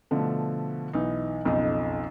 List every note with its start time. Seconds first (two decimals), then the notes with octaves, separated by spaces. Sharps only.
0.11 B2 D3 F3 A3
0.93 B1 E3 D#4
1.45 F#1 B1 F2 D#4 D#5